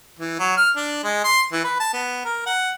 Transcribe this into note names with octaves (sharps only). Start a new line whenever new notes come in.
E3
F#3
F6
D4
G#3
C6
E3
B4
A5
B3
A#4
F#5